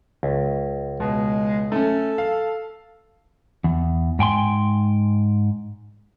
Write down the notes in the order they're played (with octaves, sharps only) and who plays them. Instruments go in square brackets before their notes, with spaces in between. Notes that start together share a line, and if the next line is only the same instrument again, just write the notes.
[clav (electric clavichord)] C#2
[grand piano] B2 [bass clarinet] G#3
[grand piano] A3 C#4 [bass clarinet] A4
[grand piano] F5
[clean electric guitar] E2
G#2 G5 G#5 C6